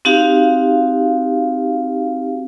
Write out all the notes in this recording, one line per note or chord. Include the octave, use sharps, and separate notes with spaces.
C4 D#4 F#4 G4 F5